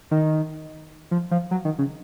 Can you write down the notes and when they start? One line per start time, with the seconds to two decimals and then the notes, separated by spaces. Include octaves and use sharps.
0.11 D#3
1.11 F3
1.31 F3
1.51 F#3
1.65 D#3
1.79 C#3